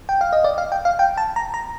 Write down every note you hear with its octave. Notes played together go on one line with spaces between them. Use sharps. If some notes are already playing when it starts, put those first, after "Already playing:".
G5
F5
D#5
D5
F5
G5
F5
G5
A5
A#5
A#5